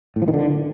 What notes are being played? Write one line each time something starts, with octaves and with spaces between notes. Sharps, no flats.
A2
F3
D#3
D3